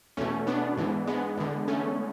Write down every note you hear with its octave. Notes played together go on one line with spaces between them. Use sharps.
E2 B2 A3 C#4
B3 D4
G#2 E3
G#3 B3
E2 D3
A3 C#4